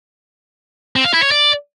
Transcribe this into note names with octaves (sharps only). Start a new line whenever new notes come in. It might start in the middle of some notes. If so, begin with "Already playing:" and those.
C4
F5
E4
C#5
D5